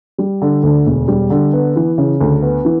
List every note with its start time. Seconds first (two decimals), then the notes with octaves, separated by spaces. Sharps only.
0.18 G3
0.42 D3
0.63 D2
0.86 E1
1.08 G3
1.30 D3
1.53 B3
1.76 E3
1.98 C#3
2.21 D2
2.42 B3
2.65 E3